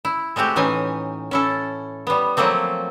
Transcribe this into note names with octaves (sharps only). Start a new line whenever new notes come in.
E4
G#3 A3 C4 F#4 G4
A2 E3 C#4 D#4 G#5
C#4 E4 A4
G3 B3
F3 F#3 A3 A#3 C4